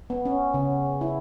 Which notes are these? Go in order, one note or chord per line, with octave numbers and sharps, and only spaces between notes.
B3
C#4
C#3
E4